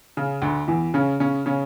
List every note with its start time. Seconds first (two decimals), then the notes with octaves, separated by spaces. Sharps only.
0.17 C#3
0.42 D2 D3
0.68 E2 E3
0.94 C#3 C#4
1.20 C#3 C#4
1.46 C#3 C#4